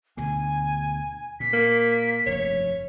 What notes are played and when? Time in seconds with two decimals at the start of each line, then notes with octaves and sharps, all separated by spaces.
0.17 D2 B2 D3 G#5
1.40 A#2 B6
1.53 A#3
2.26 F1 G2 C#5